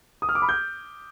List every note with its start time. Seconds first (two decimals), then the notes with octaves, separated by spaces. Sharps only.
0.22 D#6
0.29 F6
0.35 D6
0.42 B5
0.49 G6